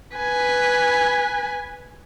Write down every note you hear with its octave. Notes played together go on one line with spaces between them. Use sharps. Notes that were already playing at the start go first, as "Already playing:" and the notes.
B4 G#5